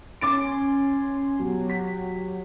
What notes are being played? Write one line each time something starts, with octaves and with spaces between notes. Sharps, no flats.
C#4 G#5 C6 D6 A6 D7
B2 F#3 G4
B6